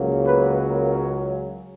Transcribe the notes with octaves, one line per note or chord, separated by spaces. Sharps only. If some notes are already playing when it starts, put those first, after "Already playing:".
Already playing: C#2 C#3 F#3 A#3
B3 B4
A#3 A#4